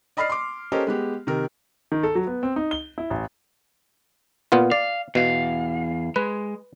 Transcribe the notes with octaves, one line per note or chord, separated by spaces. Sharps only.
D5 D#5 B5 D#6 F6 C7
C6 D6
C#4 G4 A4 A#4 C5 D#5
G#3 B3 G4
C3 D#3 A#4
D#3
A4
F#3
B3
C4
D#4
G7
E4
A1
A#2 B3 F4
D5 F5
E2 B2 F5
G#3 B4